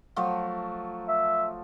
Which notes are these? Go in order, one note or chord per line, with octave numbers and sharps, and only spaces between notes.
F3 F#3 A3
E5